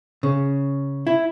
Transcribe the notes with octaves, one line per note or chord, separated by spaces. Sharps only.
C#3
E4